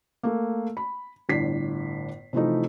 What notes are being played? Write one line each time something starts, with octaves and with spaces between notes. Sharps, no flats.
A3 A#3
B5
G1 A2 D4 B6 C7
C3 E3 F3 A3 D#4